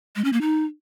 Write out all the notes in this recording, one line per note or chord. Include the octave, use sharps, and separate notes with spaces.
G#3
C#4
A#3
D#4